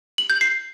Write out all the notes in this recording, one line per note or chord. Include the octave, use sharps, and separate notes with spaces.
F#7
G6
C7